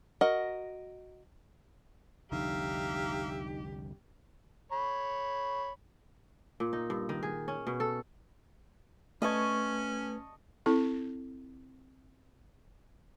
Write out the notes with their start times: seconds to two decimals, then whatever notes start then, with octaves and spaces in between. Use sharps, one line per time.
0.21 F#4 A#4 D#5 F#5
2.32 C2 F2 D3 D#4 G4 E5 F5 A#5
4.72 C#5 B5
6.60 A#2
6.73 D#4
6.90 G2
7.09 D#3
7.23 G#4
7.48 C#4
7.67 B2
7.80 A4
9.22 A3 C#4 B4 D#5 A5 C#6 G#6
10.66 C4 E4 A4